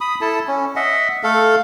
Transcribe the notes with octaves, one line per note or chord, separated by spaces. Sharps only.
B5 D#6
E4 A4 A5
C#4
D#5 E5 F#5
A3 A4 F5